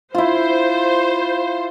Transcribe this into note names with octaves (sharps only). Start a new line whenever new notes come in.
E4 F4 C5